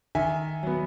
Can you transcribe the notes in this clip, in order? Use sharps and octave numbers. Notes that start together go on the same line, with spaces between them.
D#3 E5 G#5
F#3 B3